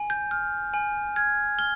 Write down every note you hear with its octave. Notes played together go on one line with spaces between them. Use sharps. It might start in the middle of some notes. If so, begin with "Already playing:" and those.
Already playing: G#5
G6
F6
G#5
F6 G#6
F6 G7